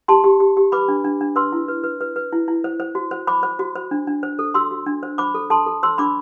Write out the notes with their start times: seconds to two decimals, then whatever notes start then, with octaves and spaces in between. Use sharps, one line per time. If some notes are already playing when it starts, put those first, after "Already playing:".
0.08 G4 A5 C6
0.24 G4
0.40 G4
0.57 G4
0.72 B4 B5 D6
0.88 D4
1.05 D4
1.21 D4
1.36 B4 C6 E6
1.52 E4
1.68 B4
1.84 B4
2.01 B4
2.16 B4
2.32 E4
2.48 E4
2.64 C5
2.80 C5
2.95 F#4
3.11 C5
3.27 C5 B5 D6
3.43 C5
3.59 F#4
3.75 C5
3.91 D4
4.07 D4
4.23 C5
4.39 A4
4.54 F#4 C6 E6
4.71 F#4
4.86 D4
5.03 C5
5.18 C5 B5 D6
5.35 A4
5.50 A4 A5 C6
5.66 A4
5.83 C5 C6 E6
5.98 D4 B5 D6